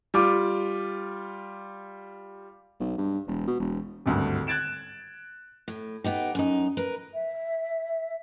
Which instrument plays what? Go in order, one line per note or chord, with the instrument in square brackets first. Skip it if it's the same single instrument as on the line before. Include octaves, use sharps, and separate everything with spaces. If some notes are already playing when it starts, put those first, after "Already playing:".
[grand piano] G3 F4 D6
[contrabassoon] B1
G2
E1
B2
E1
[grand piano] G#1 D2 G2
F#6 G#6 A6 D7 E7
[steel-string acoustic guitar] A2
B3 D#4 G4
F#2 D#4
A#4 B4
[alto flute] E5